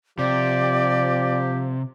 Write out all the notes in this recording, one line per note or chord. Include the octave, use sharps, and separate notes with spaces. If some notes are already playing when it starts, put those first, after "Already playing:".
C3 F3 G4 D5